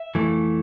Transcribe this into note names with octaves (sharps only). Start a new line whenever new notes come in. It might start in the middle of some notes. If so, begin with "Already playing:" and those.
Already playing: E5
F2 E3 A3